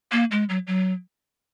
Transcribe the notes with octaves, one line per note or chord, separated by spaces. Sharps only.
A#3
G#3
F#3
F#3